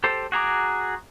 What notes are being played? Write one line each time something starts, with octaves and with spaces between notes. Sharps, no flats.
G4 A4 C5
F#4 G#4 A#5 D6